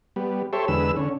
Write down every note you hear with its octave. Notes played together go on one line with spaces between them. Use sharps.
G3 B3
G4 A4 C5 C#5 E5
E2 D3 G#3 B4 E6
D3 C#4